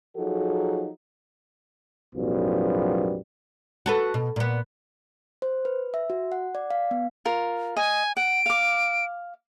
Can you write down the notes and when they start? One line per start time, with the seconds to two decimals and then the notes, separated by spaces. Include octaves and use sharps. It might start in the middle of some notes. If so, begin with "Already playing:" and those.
0.16 F3 F#3 D#4 F#4 G#4 A4
2.15 B1 F#2 A2 F3 G3 B3
3.86 F#4 A4 B4
4.14 B2
4.36 A#2 B3
5.42 C5
5.65 B4
5.94 E5
6.10 F#4
6.32 F#5
6.55 D5
6.71 F5
6.91 B3
7.25 F4 A#4
7.77 D#5 G#5
8.17 F#5 D7
8.46 F5 D6